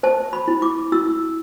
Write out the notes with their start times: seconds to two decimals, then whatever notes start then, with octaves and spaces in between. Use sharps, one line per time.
0.03 C5 A5
0.33 B5
0.48 E4
0.62 D6
0.92 E4 E6